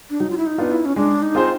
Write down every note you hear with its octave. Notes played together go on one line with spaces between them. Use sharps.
D4
F#3 D#4
F4
E4
D#4
B3 D4 F4
E4
C#4
G#3 D4
D#4
C4 F4 G#4 C5